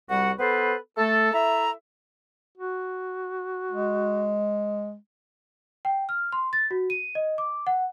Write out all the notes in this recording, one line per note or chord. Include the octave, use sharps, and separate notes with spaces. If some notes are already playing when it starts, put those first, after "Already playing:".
C2 G3 F#4 F#5
B3 A4 B4 C5
A3 A4
E4 A4 E5 A#5
F#4
G#3
G5
F6
C6
A6
F#4
D#7
D#5
D6
F#5